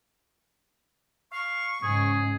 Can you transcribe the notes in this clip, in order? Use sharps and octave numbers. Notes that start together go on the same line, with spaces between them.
F5 C#6
G#2 C#3 G#4